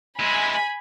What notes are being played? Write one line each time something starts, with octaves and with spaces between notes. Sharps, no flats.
G#3 E4 G#5 B5